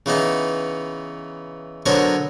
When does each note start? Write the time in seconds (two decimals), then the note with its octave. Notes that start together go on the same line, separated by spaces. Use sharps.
0.06 C#3 E3 B3 D#4
1.86 D3 F#3 B3 A#4 C5 C#5